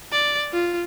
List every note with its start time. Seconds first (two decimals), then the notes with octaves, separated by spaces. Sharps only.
0.12 D5
0.53 F4